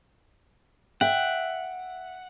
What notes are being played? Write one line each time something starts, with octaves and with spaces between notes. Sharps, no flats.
E5 F#5 G5